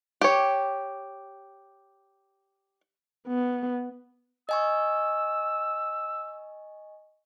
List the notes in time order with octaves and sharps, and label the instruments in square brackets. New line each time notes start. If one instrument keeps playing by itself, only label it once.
[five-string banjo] G4 C#5
[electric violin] B3
[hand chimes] D#5 G#5 C#6 [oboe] E6